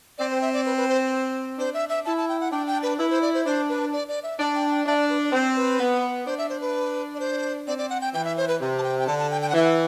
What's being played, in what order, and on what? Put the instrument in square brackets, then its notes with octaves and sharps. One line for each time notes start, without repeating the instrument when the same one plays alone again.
[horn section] C4 [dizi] D5
[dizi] C5
E5
D5
B4
B4
C5
[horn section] D4 [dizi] C5
[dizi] E5
E5
[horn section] E4 [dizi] A5
[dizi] A5
G5
F#5
[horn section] D4 [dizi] G5
[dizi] G5
B4
[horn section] E4 [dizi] B4
[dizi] C5
D5
C5
[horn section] D4 [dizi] C5
[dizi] B4
D5
D5
E5
[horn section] D4
[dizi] G5
G5
[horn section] D4 [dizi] E5
[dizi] D5
B4
D5
[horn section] C4 [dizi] C5
[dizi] B4
[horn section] B3
[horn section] D4 [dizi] C5
[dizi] E5
C5
B4
D5
C5
[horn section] C4 [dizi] D5
[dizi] D5
F#5
G5
[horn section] E3 [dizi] G5
[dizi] E5
C5
B4
[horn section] C3
[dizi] A5
G5
G5
[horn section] D3 [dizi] A5
[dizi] A5
G5
G5
F#5
[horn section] E3 [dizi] E5
[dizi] F#5